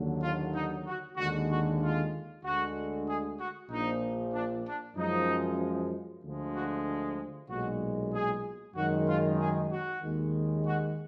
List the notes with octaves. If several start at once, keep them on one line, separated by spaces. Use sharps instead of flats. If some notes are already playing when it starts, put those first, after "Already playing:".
Already playing: D#2 D3 F#3
F4
D#4
F#4
D#2 D3 G#3 F#4
F#4
F4
D2 D3 G#3 F#4
G#4
F#4
A#1 A#2 F3 D#4
D4
D4
F#2 F3 G#3 D#4
D2 D3 F3 G#3
F#4
B1 A#2 G#3 F#4
G#4
F#2 D#3 G#3 F#4
F4
G#4
F#4
D#2 D#3 G#3
F#4